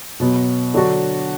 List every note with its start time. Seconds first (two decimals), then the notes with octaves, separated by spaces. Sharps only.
0.20 B2 F#3 B3
0.74 D3 F#3 D4 F#4